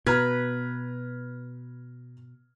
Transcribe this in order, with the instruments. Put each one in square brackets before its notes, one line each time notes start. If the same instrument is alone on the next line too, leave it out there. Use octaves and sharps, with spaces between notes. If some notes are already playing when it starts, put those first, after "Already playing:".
[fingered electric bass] B2 [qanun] B4 [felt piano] A#5 F6 G#6